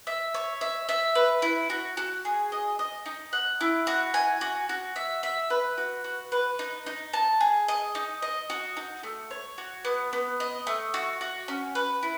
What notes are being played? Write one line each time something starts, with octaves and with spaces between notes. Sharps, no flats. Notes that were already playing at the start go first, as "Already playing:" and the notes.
E5
C#5
E5
E5
B4
E4
F#4
F#4
G#4
D#5
D#5
D#4
F#5
E4
F#4
G#5
F#4
F#4
E5
E5
B4
F#4
F#4
B4
D#4
D#4
A5
G#4
D#5
D#4
D#5
F#4
D#4
A3
C#5
F#4
B3
B3
D#5
A3
F#4
F#4
C#4
B4
E4